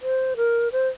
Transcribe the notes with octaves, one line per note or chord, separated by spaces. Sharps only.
C5
A#4
C5